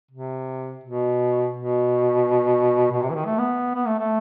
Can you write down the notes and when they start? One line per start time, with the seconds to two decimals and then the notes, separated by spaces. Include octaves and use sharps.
0.11 C3
0.84 B2
1.57 B2
2.92 B2
3.02 C3
3.10 E3
3.15 D#3
3.26 A3
3.38 B3
3.75 B3
3.87 A3
3.99 A3